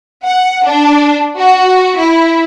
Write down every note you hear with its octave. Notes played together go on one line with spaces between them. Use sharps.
F#5
D4
F#4
E4